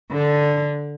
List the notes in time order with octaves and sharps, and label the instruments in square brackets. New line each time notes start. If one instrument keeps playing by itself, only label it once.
[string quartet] D3